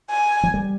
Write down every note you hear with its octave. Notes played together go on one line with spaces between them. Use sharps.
G#5
F3
G3